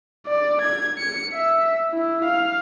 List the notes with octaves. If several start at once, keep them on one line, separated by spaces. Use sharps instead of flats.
D5
G#6
C#7
E5
E4
F5